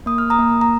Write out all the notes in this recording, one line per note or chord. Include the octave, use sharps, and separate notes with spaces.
A#3 D#6
F6
A#5 D#6
A#3
A#5